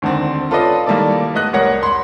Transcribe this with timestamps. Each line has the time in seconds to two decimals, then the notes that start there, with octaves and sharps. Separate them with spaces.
0.02 D2 D3 D#3 C4
0.50 C#4 F4 A4 B4 D5 D#5
0.86 D#3 G3 A#3 E4 A4 D5
1.34 A3 B3 D#5 F#6
1.53 C2 A#4 C#5 F#5 A#6
1.83 B5 C6